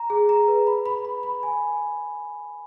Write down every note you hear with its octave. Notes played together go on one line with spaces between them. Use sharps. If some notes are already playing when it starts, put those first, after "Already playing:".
Already playing: A#5
G#4
A#5
B4
B5
B5
B5
B5
G#5